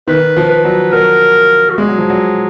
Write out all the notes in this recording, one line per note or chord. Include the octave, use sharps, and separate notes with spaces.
D#3 B4
F3
B4
F#3
F#3 A#4
F#4
G#3 G#4
F#3
F3
F#3